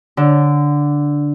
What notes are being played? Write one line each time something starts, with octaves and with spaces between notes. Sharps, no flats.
D3